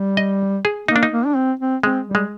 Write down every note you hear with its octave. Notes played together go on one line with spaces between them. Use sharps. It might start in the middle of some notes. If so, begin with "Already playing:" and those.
Already playing: G3
D#5
G#4
A#3 D#4
D4
D#4
A#3
D4
C4
C4
G#3 C4
G3
G#3